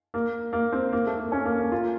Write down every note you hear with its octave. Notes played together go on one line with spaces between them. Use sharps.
A#3
A#3
C4
A#3
A3
A#3
C#4
A#3
A#3
F4